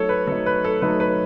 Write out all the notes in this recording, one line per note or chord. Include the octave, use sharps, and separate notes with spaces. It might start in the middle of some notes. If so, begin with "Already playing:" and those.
Already playing: F#3 A3 D#4 A4 C#5
B4
F#3 A3 D#4 A4
B4
A4
F#3 A3 D#4 B4
B4